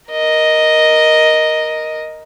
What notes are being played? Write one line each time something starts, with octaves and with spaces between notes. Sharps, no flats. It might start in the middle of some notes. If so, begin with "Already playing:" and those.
A#4 D#5